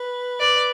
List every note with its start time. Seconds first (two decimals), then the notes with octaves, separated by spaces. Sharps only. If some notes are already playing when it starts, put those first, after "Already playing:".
Already playing: B4
0.40 B4 D5